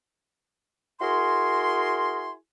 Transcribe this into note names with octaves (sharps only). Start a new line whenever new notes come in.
E4 F#4 G#4 A#4 G#5 C6